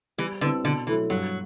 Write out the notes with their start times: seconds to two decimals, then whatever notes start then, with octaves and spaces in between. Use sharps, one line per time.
0.18 E3 G3
0.41 D3 C4 E4 B4
0.64 B2 D3
0.87 E3 F#3 A3 E4 A4
1.10 G2 F#3